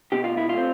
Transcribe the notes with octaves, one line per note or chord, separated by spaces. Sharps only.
B2 G4
F4
E4
F4
A3 C4